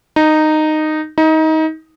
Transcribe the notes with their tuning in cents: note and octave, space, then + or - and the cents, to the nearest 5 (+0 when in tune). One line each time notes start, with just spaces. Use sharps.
D#4 -10
D#4 +25